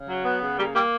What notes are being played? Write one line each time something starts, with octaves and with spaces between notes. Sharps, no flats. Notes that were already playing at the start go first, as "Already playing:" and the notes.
Already playing: C#3
F#3
B3
C#3
G3 A#3 G4
G3 A#3 G4